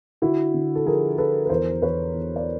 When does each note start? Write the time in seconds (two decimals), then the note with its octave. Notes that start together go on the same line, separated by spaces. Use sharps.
0.22 D3 E4 F#4
0.54 D3
0.75 A4
0.86 F3 G#4 A#4
1.18 F3 A4 B4
1.45 B4
1.49 E2 A#4 C5
1.81 E2 B4 C#5
2.14 E2
2.36 D5